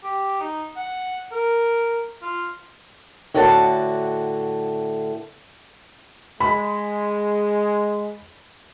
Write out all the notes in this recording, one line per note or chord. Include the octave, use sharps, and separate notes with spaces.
G4
D#4
F#5
A#4
F4
A2 D3 F#4 F#5 A5
G#3 B5